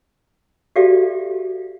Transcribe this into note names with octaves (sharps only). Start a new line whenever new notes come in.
F#4 G4 A4 D5 E5 F5